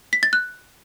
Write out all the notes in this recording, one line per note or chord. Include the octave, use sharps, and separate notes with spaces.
B6
A6
F#6